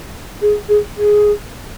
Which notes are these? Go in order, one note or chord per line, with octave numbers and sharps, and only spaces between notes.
G#4
G#4
G#4